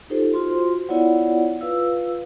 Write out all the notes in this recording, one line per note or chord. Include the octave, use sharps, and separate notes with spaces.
D#4 F4 G4 A4 C5
F4 F#4 C5 C6
B3 E4 F4 C#5 D5 F#5
F4 B4 F5 E6